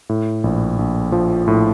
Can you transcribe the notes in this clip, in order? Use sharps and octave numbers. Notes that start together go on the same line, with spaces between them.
A2
A#1
A#1
F3
A2